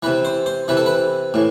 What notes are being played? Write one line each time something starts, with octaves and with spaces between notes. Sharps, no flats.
C3 E3 B4
C5
C5
C3 E3 B4
A4
B4
A2 E3